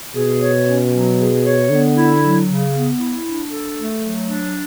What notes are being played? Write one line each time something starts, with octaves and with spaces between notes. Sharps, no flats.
B2 G#4
C#5
C#4
F#3
G#4
C#5
D3 B3
E4
F#3
C#3
B3
E4
D4
A4
A3
F#3
D4